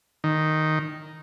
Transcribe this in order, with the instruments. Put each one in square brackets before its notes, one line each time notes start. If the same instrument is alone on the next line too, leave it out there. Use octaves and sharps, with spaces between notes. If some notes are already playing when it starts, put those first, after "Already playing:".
[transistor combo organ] D#3